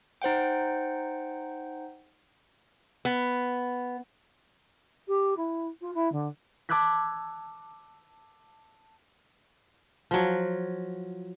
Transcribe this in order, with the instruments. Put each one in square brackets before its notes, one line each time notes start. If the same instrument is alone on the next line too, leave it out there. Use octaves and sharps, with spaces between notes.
[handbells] D#4 C5 F#5 G5
[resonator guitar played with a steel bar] B3
[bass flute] G4
E4
F4
E4
D3
[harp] A5 D6 E6 F#6 G#6 B6
[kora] F3 F#3